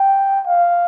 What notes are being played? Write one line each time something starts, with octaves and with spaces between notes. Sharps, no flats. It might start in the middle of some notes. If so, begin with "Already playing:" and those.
Already playing: G5
F5